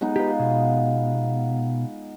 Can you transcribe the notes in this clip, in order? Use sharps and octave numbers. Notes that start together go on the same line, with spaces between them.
G#3 B3 D#4
F4 G4 B4
B2